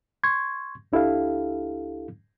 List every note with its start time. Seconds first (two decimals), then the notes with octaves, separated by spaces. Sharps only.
0.23 C6 C#6 G#6
0.92 C#2 D4 E4 G4 A4 F5